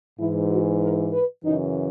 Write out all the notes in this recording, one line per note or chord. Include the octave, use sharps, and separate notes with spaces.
G#2 E3 E4
F#4
A#4
B4
F#2 C#3 E3 D#4